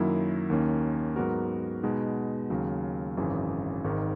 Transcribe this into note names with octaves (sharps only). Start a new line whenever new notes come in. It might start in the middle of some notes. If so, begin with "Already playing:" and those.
Already playing: F#2 D#3 F#3 A#3 E4
D#2 D#3 A#3 C#4
G#2 F#3 B3 F#4 A#4
B2 G#3 B3 D#4
D#2 C#3 F#3
G#1 F#2 C#3 E3
G#1 G#2 D#3